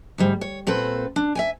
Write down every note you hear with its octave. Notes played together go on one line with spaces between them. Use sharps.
D2 G#2 G3
C#5
A#2 C4 A4 B4
D4
E5 G5 G#5